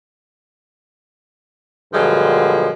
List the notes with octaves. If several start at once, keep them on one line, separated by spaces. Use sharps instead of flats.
G2 A#2 D3 F3 F#3 G#3